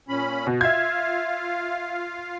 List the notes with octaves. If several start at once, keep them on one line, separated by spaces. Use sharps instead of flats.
A#2 C#4 B5
B2
F4 E5 F5 G#6